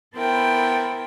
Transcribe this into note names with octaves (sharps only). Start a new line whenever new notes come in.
B3 E4 A4 A#4 C5 G5